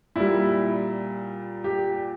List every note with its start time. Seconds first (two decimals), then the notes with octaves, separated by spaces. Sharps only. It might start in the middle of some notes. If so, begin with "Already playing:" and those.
0.16 A#2 G3 E4
1.64 G4